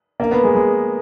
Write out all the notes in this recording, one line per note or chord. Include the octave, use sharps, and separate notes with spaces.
A#3
B3
G#3
G#3